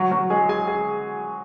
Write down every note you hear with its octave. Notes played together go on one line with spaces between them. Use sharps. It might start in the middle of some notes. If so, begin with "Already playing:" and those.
Already playing: F#3 F#4
F#3 F#4
G#3 G#4
G#4 G#5
G#4 G#5